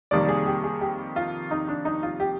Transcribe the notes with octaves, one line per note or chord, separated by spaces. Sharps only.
F2 C3 D#3 G3 A#3 D5
G#4
G4
G#4
G4
F4
D#4
D4
D#4
F4
G4